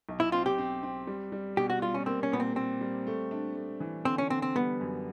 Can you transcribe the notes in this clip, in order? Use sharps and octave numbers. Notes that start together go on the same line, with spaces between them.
B1
E4
C4 F4
G4
C4
C4
G3
G3
B2 G4
F#4
G3 F4
C#4
A#3 C4
C#4
A#2 B3
C4
A#3 C4
G3
A3
D4
A3
E3
D3 C4
C#4
D3 C4
C4
G3 B3
F#2